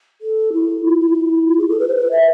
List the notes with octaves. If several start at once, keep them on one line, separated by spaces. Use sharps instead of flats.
A4
E4
F4
F4
E4
F4
G#4
A4
B4
C5
B4
E5